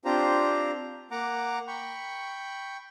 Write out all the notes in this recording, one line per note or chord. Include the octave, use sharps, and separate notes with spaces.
C4 D4 F4 G4 C5 A#5
A#3 F#5 A#5 D6
G5 B5 C#6